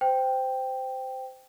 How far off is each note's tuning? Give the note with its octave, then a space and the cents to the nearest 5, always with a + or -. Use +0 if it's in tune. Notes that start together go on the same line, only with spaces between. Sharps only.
C5 -15 G5 +0